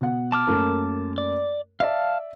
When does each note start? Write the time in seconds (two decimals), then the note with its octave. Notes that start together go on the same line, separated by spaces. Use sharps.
0.01 B2 F#5
0.32 A5 D6 F6
0.47 F#2 A3 A#3
1.18 D5
1.80 D5 E5 F5 A5